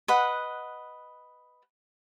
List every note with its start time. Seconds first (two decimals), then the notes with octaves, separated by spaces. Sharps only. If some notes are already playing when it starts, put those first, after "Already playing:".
0.08 B4 D#5 F#5